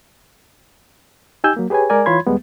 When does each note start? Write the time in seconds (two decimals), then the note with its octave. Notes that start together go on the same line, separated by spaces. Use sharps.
1.44 D#4 G4 G#5 E6 G6
1.57 F#3 A#3
1.70 G4 G#4 B4 C#5 G#5
1.90 G#3 A#4 D5 G#5
2.06 E3 F4 C#5 B5 C6 G#6
2.27 D#2 G3 G#3 B3